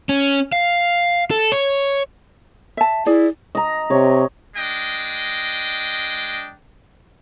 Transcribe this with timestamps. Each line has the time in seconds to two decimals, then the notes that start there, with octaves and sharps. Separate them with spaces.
0.09 C#4
0.52 F5
1.31 A4
1.52 C#5
2.77 E5 A5
3.06 E4 G#4 D5
3.55 D#5 A#5
3.90 C3 C#5
4.56 G#3 D4 D#5 G5